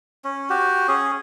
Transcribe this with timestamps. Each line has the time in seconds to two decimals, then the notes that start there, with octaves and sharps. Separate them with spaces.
0.25 C#4
0.50 F#4 G4
0.88 C#4 G#4